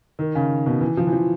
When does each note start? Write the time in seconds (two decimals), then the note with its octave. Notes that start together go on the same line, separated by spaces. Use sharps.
0.19 D#3
0.35 C#3
0.66 B2
0.81 E3
0.97 F3
1.07 E3
1.12 F3